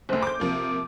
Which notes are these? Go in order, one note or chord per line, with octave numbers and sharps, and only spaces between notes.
F#1 D2 C5
D6 G6
C3 F3 A#3 D6